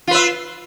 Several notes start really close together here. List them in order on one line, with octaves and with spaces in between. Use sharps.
F4 B4 E5